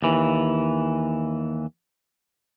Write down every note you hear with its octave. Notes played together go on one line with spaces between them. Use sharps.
D#2 E3